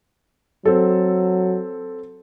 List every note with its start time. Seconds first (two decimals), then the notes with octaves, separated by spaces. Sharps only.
0.65 F#3 C4 A4